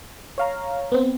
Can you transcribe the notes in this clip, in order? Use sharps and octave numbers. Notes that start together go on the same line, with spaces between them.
C#5 F5 A#5
B3 C4